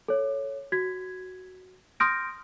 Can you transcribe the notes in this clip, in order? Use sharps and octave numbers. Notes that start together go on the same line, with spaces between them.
A4 C#5
F#4 G#6 B6
C6 D#6 F6 G6 A#6 D7